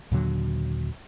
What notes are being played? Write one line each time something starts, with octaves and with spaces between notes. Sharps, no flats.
D#2 A#2 D3 F#3